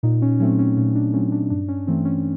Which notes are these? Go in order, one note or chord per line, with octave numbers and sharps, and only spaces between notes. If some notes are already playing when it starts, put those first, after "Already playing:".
A#2 D#4
C#4
F#3 A3 C4 C#4
C#4
A#2 C#4
D4
F#3 A3 C4 C#4
D4
G2 D4
C#4
E3 A3 C4
C#4